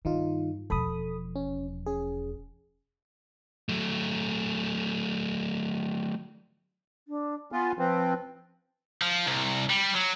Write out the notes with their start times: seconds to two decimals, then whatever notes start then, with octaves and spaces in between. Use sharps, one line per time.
0.05 G2 D#3 D#4 F4
0.70 E1 F3 A4 B5 D#6
1.36 C#4
1.86 C#4 G#4
3.69 F#3 A3
7.08 D4
7.52 B3 F4 G#5
7.79 F3 C4 B4
9.02 F3
9.27 C2
9.70 G3
9.94 F#3